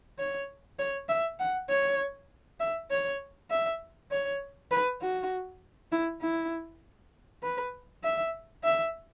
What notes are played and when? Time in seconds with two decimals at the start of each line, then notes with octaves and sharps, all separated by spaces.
0.19 C#5
0.79 C#5
1.09 E5
1.40 F#5
1.70 C#5
2.60 E5
2.90 C#5
3.50 E5
4.11 C#5
4.72 B4
5.01 F#4
5.92 E4
6.22 E4
7.43 B4
8.04 E5
8.64 E5